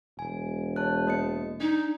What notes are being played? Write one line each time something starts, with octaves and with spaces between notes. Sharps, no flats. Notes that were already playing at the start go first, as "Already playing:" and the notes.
E1 G#5
C#5 A5 F#6
A#3 D#5 C#7
D4 D#4